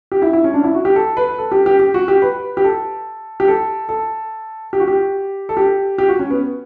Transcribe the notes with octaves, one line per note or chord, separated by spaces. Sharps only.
G4
E4
E4
C#4
D4
E4
F#4
G4
A4
B4
A4
G4
G4
G4
F#4
G4
B4
G4
A4
G4
A4
A4
G4
F#4
G4
A4
G4
G4
F#4
C#4
B3